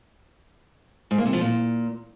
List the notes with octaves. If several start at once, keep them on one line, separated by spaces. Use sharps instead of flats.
G#2
A#3
C3
F3
A#2